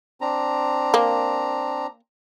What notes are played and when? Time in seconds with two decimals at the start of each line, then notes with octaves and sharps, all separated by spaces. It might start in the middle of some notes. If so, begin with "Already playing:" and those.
0.21 C4 D4 A#5
0.94 A#3